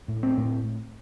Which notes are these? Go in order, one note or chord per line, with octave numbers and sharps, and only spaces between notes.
A2
C4
A2